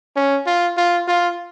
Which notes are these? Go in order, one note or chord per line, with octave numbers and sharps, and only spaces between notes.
C#4
F4
F4
F4